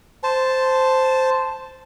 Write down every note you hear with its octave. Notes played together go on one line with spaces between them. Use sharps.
C5 A5